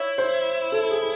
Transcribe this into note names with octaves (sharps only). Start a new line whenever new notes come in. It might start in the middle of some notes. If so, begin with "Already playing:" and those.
Already playing: E4 C#5
C5
A4
G#4